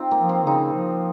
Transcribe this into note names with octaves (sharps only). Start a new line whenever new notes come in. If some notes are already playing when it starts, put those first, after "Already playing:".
Already playing: C4 D#4 F4
A#3
F3
C4
C#3 D#4
F3